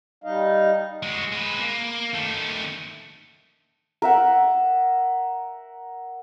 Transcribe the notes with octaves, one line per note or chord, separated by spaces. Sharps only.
G3 D#4 D#5 F5
G#3 F#4
G#3 B4
A#3
D#3 A3
A#4 E5 F#5